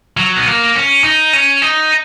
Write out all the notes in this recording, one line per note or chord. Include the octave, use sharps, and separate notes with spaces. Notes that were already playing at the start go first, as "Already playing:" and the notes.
F#3
B3
A#3
C#4
D#4
C#4
D#4